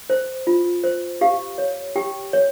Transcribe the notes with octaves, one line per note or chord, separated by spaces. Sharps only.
C5
F4
C5
G4 F5
C#5
G4 G5
C#5